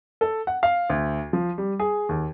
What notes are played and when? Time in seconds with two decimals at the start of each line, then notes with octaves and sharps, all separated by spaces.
0.21 A4
0.47 F#5
0.63 F5
0.90 D2
1.33 F3
1.58 G3
1.80 G#4
2.09 D#2